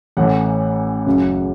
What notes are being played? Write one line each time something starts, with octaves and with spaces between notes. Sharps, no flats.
A1 A2 E3 F#5
F#1 F#2 C#3